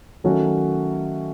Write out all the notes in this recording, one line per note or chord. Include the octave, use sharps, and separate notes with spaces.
D#3 F#3 A3 C#4 F#4